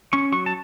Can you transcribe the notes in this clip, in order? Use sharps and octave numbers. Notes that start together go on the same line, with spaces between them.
C#4 C#6
F#3 C#6
A5